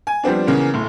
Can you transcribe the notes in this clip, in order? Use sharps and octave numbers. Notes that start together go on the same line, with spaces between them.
G#5
F3 G3 B3 C4 D4
C#3 E3 A#3 B3 C#4
E1 A2